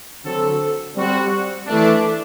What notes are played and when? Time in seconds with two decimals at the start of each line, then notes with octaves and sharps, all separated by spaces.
0.24 D3 F#3 C4 F#4 A4
0.95 G3 C4 F#4
1.66 E3 A3 D4